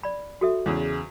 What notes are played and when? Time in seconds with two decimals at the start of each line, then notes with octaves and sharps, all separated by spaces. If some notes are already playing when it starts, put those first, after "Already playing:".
0.03 D5 B5
0.41 F#4 A4 E5
0.66 E2 C#3 C5